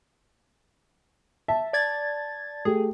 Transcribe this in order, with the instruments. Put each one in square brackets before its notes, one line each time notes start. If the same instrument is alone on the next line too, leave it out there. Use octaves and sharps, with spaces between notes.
[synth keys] E5 [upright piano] A5
[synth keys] D5 G#6 A6
[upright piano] A3 G4 [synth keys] G#4